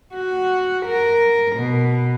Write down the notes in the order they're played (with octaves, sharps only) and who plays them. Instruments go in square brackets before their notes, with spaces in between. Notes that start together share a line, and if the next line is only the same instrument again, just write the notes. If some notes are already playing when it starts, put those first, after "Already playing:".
[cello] F#4
A#4
B2